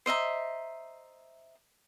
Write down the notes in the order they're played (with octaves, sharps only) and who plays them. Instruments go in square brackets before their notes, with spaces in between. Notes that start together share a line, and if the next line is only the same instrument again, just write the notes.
[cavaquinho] C5 D#5 E5 A#5